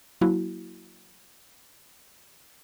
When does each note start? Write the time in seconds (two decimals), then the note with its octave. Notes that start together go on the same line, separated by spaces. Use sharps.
0.21 F#3 A#3 E4 F#4